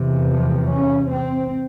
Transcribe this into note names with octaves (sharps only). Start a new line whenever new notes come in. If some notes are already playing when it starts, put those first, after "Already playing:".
Already playing: E2 C3
F3
C#4
C4